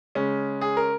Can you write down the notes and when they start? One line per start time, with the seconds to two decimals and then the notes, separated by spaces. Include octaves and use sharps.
0.15 C#3 G#3 C#4
0.61 G#4
0.77 A#4